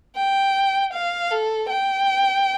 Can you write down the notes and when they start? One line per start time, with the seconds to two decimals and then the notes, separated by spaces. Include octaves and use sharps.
0.16 G5
0.93 F5
1.31 A4
1.69 G5